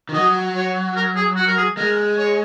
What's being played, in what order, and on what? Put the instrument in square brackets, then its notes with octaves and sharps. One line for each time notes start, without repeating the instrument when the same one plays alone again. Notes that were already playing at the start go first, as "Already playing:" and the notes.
[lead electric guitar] D#3
[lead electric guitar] F#3 [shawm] D#5
[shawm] C#5
A#4
G#4
F#4
A#4
G#4
[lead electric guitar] G#3 [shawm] A#4
[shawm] C#5